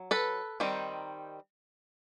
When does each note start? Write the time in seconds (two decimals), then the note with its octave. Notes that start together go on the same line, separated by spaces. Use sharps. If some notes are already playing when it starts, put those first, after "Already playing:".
Already playing: F#3
0.11 A4 B4
0.60 D#3 G3 C4 D#4